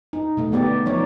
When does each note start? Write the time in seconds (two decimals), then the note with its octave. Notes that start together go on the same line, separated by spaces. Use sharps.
0.13 D#4
0.37 B2 A3
0.52 D3 B3 G4 D5
0.86 F3 D#4 C#5 D5